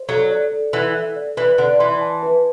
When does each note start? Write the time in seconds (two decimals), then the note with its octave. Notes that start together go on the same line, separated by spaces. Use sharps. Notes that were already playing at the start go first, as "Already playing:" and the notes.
Already playing: C5
0.09 F#3 A4
0.31 D5
0.51 A4
0.73 E3 F#5
0.94 A4
1.16 D5
1.37 E3 B4
1.58 D3 F#5
1.79 E3 C6
2.01 A5
2.23 B4